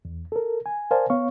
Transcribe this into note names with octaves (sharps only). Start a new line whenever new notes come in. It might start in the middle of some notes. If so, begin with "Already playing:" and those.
E2
A4 A#4
G#5
A#4 C5 D5 F5 G#5 A5
B3 C#5 F5 C#6